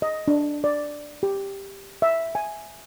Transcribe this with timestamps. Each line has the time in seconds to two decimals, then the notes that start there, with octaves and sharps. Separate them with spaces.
0.02 D#5
0.28 D4
0.64 D5
1.23 G4
2.02 E5
2.35 G#5